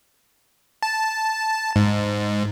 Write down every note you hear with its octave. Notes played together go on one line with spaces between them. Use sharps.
A5
G#2